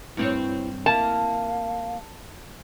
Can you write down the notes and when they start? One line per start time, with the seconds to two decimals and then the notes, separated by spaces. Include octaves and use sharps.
0.17 G2 C4 E4 C#5
0.86 A#3 E4 F5 A5